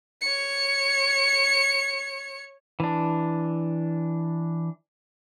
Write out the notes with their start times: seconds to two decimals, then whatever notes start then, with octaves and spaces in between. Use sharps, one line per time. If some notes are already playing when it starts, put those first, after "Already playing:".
0.21 C#5 C#7
2.80 E3 D4